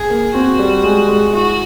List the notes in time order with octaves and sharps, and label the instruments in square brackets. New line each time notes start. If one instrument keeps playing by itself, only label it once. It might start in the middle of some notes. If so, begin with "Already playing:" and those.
Already playing: [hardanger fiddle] G#4
[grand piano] A#3
[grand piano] C4 [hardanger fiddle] F#4
[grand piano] G3
G#3
G#3
[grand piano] E4 [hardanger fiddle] F#4